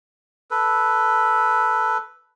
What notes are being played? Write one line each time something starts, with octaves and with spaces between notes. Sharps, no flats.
A4 B4